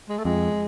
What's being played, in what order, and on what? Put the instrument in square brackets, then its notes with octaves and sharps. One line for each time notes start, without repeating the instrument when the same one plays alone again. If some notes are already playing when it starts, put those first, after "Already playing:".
[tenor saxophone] G#3
A3
[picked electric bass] F2 [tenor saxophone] G#3